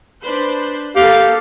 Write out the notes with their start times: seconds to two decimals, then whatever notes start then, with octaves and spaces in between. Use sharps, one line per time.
0.23 D4 B4 C5
0.96 A#3 G4 A4 F5